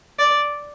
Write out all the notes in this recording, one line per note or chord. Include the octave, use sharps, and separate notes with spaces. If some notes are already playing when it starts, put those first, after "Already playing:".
D5